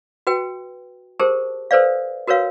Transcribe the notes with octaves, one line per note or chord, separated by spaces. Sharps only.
F#4 B4 G5
G4 G#4 A#4 C5 A5
A4 B4 C5 D5 F5
F#4 A#4 B4 C#5 F5